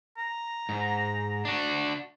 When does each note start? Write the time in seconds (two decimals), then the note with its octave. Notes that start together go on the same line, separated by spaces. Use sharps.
0.18 A#5
0.69 G#2
1.45 D4 F#4